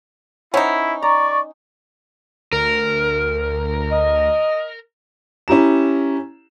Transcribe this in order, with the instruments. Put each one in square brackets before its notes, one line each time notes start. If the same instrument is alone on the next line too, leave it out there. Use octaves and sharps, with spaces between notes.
[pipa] C#4 D#4 [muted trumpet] E4 [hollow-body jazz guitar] C5 C#5 F#5
[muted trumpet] D5 [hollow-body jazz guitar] A#5 [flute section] C#6
[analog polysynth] D2 [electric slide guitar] A#4
[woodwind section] D#5
[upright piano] C#4 E4 G4 A#5 E7